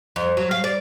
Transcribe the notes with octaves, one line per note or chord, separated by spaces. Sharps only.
F2
F#3
F5
D5